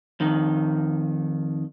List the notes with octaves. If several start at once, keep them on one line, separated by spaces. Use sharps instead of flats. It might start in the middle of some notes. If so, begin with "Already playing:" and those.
F2 D#3